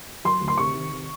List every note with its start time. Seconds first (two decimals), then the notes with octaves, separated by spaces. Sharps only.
0.25 F#3 C6
0.41 D2
0.48 C6
0.58 C3 C#6
0.74 D#3
0.91 C3